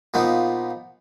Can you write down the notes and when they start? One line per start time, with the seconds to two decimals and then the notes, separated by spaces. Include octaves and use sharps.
0.14 A#2 F3 B3 D#4